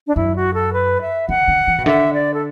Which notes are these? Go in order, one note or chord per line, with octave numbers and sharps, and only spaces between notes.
D4
F#2 E4
F#4
A4
B4
E5
D3 F#5
D3
E3
B2
D3 E5
D5
A4